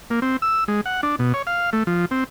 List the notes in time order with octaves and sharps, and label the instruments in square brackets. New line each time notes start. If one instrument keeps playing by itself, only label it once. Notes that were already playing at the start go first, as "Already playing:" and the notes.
[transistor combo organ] A#3
C4
E6
G#3
F#5
D4
B2
C#5
F5
A3
F3
C4